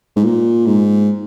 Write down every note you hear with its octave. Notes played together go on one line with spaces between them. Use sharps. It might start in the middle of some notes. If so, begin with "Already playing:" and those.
G#2
A#2
G#2